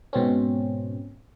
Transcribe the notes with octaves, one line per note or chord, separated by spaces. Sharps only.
G#2 B2 C4 C#4